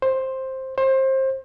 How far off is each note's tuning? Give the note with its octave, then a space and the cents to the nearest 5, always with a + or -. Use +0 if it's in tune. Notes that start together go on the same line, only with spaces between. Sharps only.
C5 +10
C5 +25